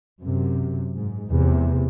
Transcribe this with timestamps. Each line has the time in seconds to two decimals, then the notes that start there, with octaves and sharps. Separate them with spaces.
0.20 F#2 C3
0.95 G#2
1.28 F1 E2 C3